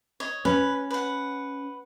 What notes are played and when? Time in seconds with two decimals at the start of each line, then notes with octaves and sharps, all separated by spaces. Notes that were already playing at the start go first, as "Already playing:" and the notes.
0.20 C#5 D#5
0.45 C#4 B4
0.91 B4 F#5